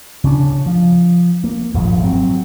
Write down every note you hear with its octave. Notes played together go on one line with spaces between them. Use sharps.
C#3 C#4 D4
F3
A#3
D#1 G#1 G2 F3
F#3 C4